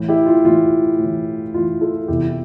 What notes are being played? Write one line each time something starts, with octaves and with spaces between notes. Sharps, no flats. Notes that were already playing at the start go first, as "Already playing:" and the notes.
Already playing: A2 E3
E4 G4
F4
A2 E3 F4
A2
E3
A2 E3 F4
F4 A4
E2 C3 E3 E4 G4
E4